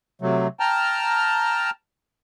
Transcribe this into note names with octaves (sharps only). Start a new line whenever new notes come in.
C3 F#3 A3
G5 A5 A#5 F6